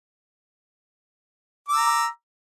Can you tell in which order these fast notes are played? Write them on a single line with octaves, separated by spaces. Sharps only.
D6 E6 A#5